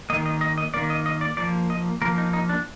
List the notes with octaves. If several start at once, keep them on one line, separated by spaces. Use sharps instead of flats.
D#3 A#3 D#5
D#5
D#5
D#5
D#3 A#3 D5
D#5
D#5
D5
F3 A#3 D5
D#5
F3 A#3 A#4
D#4
D#4
D4